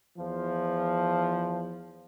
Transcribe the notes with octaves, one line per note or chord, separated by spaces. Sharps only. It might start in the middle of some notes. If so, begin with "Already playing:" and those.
E2 F3